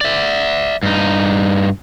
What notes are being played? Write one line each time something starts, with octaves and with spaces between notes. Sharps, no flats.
D5 E5
G2 D#4